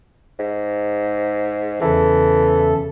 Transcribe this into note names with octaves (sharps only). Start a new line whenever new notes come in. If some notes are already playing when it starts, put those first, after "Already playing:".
G#2
E2 C#3 E3 A4